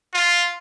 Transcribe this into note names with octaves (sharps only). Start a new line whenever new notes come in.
F4